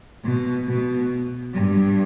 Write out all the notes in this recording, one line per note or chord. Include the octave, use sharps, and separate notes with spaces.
B2
B2
G2